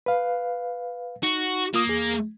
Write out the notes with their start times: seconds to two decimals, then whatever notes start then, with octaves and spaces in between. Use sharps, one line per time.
0.06 B4 F5
1.23 D#4 F#4
1.74 A#3 F4 D#6
1.87 E2 G#4